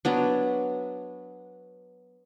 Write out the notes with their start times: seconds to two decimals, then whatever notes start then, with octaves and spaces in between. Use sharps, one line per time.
0.05 F#3 B3 D4